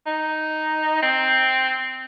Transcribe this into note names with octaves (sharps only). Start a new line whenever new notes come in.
D#4
C4